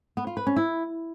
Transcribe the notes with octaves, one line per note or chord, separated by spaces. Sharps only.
B3
F4
B4
C#4
E4